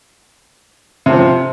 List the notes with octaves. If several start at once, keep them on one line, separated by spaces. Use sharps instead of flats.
C3 F3 C4